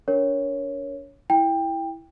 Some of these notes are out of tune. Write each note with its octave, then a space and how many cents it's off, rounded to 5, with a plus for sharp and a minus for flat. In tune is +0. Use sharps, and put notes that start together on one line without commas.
D4 -35 A#4 +0 C#5 +0
E4 +0 G5 +15